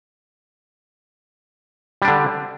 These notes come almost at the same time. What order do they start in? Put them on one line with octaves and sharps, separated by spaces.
G3 D4 D3